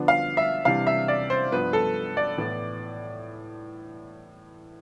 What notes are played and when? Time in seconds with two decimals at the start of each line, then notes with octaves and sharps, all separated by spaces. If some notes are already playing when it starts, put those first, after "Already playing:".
Already playing: D3 F3 B3 D4
0.08 F5
0.37 E5
0.65 C3 E3 G3 D4 F5
0.87 E5
1.08 D5
1.30 C5
1.51 G2 F3 B3 B4
1.73 A4
2.17 D5
2.37 A2 E3 B3